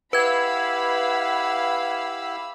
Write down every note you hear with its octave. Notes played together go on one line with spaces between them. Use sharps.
E4 G4 B4 F5 F#5 B5 E6 G#6